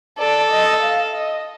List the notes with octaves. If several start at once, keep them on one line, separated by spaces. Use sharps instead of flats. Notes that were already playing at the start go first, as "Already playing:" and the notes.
A4 D5
D#5
F5
D#5